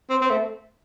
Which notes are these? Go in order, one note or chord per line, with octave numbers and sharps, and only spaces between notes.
C4
C4
A3